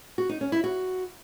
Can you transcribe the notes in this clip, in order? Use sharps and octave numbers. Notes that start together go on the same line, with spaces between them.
F#4
D#4
C#4
E4
F#4